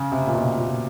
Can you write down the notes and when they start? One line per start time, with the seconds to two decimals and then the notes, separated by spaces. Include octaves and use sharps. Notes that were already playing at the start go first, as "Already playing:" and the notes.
Already playing: C#3
0.12 C3
0.27 A#2
0.35 B2
0.58 A#2